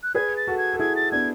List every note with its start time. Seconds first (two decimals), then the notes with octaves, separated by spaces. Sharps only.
0.03 F#6
0.15 G#4 B4 G#6
0.37 A6
0.47 F#4 A4
0.58 G#6
0.74 A4
0.80 E4 G#4 G#6
0.96 A6
1.12 B3 D4 G#6